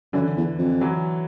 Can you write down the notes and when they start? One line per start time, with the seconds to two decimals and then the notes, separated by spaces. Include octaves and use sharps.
0.13 F#2 D3 E3
0.37 E2
0.58 F2
0.81 E3 F#3